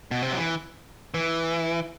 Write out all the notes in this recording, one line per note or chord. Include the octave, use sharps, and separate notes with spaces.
B2
C3
F#3
E3
E3